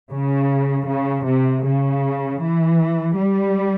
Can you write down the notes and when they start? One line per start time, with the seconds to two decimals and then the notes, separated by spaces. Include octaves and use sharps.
0.12 C#3
0.88 C#3
1.26 C3
1.66 C#3
2.42 E3
3.18 G3